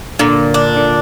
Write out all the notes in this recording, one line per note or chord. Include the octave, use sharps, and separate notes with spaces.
A#2 D3
D4
D3